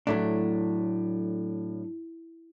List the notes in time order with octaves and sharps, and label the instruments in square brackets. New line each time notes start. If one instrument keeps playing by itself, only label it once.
[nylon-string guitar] A2 [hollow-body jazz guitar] F#3 A3 D4